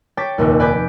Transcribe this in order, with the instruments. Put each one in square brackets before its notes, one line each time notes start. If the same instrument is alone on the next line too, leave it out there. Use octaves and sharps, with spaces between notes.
[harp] C#5 G5 A5 D6 A6 B6
F1 A#1 D#2
B4 D5 G#5 D6 G6 B6